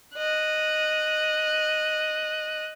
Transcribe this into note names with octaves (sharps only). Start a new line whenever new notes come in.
D#5 F#6